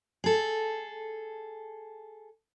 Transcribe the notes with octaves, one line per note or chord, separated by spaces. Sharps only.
G#4 A4